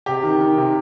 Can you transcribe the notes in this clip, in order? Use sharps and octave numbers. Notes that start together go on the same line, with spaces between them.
C3 G4
D#3
D#3
C3